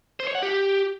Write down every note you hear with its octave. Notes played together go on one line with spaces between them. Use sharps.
C5
C#5
F#5
G4